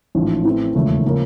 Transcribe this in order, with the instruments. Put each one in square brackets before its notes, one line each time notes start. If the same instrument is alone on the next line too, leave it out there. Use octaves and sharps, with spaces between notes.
[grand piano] A1 G#2 F3
A2 E3 A3 C4
E1 D#2 C#3 F3 A3
C#3 F3 A#3